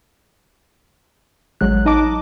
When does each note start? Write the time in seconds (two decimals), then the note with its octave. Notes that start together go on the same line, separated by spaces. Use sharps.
1.61 A1 F#3 G#3 F#6
1.86 D#4 D#5 A5 D6